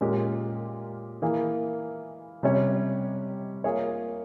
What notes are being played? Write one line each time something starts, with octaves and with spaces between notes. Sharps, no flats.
A#2 G#3 C#4 G4 A#4
E3 A#3 E4 G#4
C3 G3 C#4 G4 C#5
A#3 F4 G#4 C#5